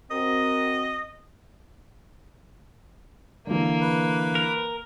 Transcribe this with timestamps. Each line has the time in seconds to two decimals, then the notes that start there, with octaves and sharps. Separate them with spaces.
0.11 C4 F#4 A#4 D#5
3.47 D3 E3 A#3
3.80 B4
4.35 A#4